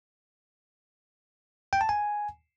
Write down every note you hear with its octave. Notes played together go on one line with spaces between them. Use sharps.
G5
A5
G#5